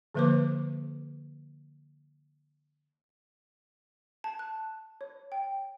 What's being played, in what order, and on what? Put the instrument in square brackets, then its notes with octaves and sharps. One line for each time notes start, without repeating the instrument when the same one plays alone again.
[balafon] D3 F3 A#3 B4 C5 D6
[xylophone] A5
F#6
C#5
G5